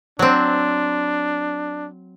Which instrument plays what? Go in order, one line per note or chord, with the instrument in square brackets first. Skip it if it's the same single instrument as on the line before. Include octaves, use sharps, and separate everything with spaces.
[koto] F#3 C4 [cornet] D4